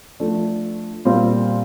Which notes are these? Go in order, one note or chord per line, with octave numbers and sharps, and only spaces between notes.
F3 A3 D4
A#2 G3 C4 F4